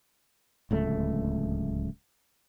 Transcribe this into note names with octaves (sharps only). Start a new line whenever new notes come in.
D1 C#2 A3